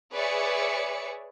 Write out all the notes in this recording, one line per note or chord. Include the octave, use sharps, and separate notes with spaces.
G#4 B4 C#5 D5 E5 C#7